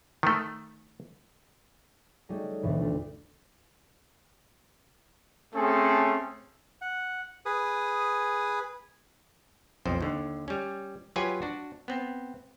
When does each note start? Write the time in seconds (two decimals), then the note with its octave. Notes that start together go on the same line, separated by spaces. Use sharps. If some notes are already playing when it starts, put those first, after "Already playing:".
0.23 D#3 A3
2.29 G3 A3 C#4 D#4 F#4 G#4
2.62 D2 G2 B2 E3
2.81 A3 D4 F4
5.55 A3 C4 C#4 G#4 A4
6.82 F#5
7.46 G#4 B4 D#6
9.86 B1 F2 C5
10.01 D#2 D3
10.48 G3 C#4
11.16 F#3 F4 G4 B4 G#5
11.42 D4 F#4
11.88 B3 C4